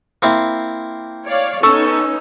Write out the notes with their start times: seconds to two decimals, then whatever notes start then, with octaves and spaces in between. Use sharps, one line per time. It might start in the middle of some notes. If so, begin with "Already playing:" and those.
0.22 A#3 C4 E4
1.25 C#5 D5 F5
1.63 B3 C#4 D#4 A4 C#6 E6